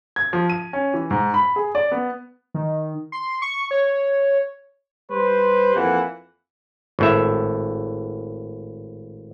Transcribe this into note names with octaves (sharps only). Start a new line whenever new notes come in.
G#6
F3
D#7
C#4
E3
G#2
B5
G#4
D5
B3
D#3
C6
C#6
C#5
G3 B4 C5
F2 E3 A#3 F#5
G#1 A2 E5